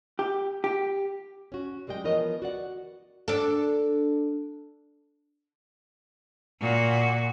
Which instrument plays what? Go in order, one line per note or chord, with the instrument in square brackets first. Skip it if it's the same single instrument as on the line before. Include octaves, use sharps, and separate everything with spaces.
[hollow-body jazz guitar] G4
G4
[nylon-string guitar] C#4 F#4
F#2 G3 G#3 D#5 G5
E3 F3 B3 A#4 C#5 D#5
F#4 D5 F#5
[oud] D4 A4
[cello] A#2 F#4